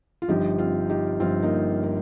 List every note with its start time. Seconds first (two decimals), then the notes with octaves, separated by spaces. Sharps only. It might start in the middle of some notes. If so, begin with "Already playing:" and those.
0.22 F4
0.28 G1 G2 F3 D#4 G4
0.58 C4 F4
0.89 D#4 G4
1.20 G1 G2 F3 C4 F4
1.43 A#3 D#4
1.83 A#4